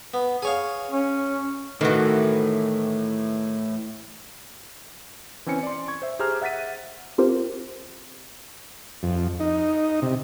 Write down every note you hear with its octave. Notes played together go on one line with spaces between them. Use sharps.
B3
G#4 C#5 F5
C#4
A2 D#3 E3 F#4 A4
E3 C4 C#4 G#5 C#7
D5 C6
C#6 G#6
C5 E5
G4 G#4 C5 A#5 F6
E5 F#5 A6 B6 D#7
C4 F4 G4 A#4 C5
F2
D#4
C3